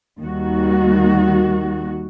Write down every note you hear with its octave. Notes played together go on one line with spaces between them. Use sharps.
D#2 D#3 G3 F#4